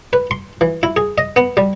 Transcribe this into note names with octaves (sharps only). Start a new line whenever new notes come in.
B4
C6
E3
E4
G#4
D#5
B3
G3